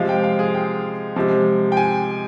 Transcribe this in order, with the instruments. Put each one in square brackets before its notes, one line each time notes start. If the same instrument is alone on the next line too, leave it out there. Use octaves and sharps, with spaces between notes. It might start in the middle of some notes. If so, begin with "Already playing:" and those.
Already playing: [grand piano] C3 F3 G#3 F5
G5
F5
G#4
G5
C3 F3 G#3
G5
G#5